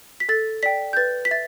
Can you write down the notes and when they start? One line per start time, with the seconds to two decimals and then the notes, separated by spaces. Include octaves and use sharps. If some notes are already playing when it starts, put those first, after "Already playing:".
0.20 B6
0.29 A4 A6
0.63 D5 G5 B6
0.93 G6
0.97 B4 A6
1.25 B6
1.31 E5 A6